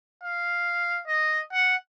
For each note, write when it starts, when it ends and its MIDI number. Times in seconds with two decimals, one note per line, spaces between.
0.23 1.02 77
1.07 1.41 75
1.53 1.76 78